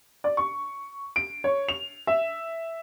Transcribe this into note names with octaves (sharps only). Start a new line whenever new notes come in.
D5
C#6
D7
C#5
F7
E5